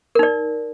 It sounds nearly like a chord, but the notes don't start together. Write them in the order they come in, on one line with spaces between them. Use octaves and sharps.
A#4 D#4 D5